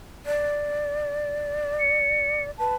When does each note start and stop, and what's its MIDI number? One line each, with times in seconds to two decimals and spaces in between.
0.26 2.51 74
1.80 2.42 97
2.59 2.75 71
2.59 2.75 81